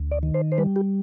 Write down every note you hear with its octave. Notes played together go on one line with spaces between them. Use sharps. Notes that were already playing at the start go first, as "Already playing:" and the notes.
Already playing: D2
D5
D#3
C5
C5
G3 B4
G4